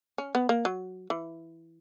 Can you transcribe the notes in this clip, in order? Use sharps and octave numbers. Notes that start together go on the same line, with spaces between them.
C#4
B3
A#3
F#3
E3